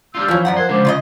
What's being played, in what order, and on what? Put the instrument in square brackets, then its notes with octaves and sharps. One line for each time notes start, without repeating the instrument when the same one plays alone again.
[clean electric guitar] G3 D4 F4 [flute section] E6 F6 G6
[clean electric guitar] E3 [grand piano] F3 [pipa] A#3 C#4
[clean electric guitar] F#2 [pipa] B3 B4 F#5 [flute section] D5 A#5
[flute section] A#4 F#6 G#6 [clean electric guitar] C5
[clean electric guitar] C#3 G#3 D4 [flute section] C5 D6
[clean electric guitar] C#3 [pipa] F4 D5 D#5